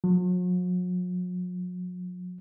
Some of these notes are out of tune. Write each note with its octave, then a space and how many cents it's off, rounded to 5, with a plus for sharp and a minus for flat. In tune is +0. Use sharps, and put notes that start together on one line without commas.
F#3 -45